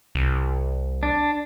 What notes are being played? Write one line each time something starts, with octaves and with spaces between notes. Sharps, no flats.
C2
D4